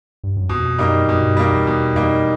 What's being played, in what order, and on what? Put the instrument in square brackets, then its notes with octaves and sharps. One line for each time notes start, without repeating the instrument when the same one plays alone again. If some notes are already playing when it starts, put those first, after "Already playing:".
[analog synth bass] G2
F#2
[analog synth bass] F2 [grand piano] B2
[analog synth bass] F#2 [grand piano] G3 A#3 D#4
[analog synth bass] F#2 [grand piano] B2
[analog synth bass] G2
[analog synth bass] F#2 [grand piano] G3 A#3 D#4
[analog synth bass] F2
[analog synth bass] E2 [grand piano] B2
[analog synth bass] F2 [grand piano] G3 A#3 D#4